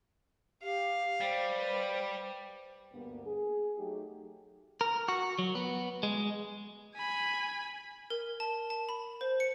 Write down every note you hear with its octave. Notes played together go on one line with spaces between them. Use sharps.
G4 F5
G3 C5
B4
D2 G2 A#3 B3
G#4
F#3 A3 D#4 G4
A#4
F#4
F#3
B3
G#3
G#5 B5
A#4
A5
A5
B5
C5
C#7